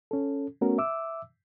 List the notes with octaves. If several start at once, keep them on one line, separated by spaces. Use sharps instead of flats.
C#4 A4
A3 B3 C#4 F#4 A#4
E5 D6 E6